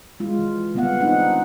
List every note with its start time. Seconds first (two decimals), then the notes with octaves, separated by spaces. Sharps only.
0.20 G#3 F4
0.39 E3
0.74 D3 G3 B3 C4 F5 F#5
1.00 C4 D4 D#4 F#5